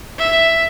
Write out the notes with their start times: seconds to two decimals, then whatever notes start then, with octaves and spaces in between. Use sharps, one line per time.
0.19 E5